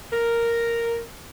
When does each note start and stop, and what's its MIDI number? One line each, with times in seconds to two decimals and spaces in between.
0.12 1.00 70